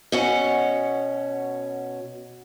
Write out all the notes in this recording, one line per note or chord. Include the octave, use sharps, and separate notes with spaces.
B2 C#4 F#5